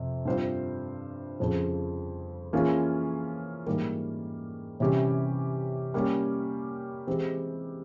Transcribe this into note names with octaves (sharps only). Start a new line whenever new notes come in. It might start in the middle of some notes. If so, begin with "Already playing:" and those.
Already playing: F2 C3
G2 G3 C4 F4 C5
F2 C#3 F3
E3 A#3 C#4 F4 G#4
G#2 E3 G3 A#3
C3 E3 G3 C#4 G4
G3 A#3 C#4 G4
E3 G#3 C4 G4